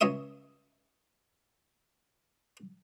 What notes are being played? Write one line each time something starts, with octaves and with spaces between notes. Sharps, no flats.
C#2 C#5 D#5 E5 D#6